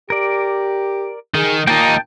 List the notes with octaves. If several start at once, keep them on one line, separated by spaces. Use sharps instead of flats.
G4 A#4 D5
D#3 G#4
A#2 A#3 D#4 G5 A5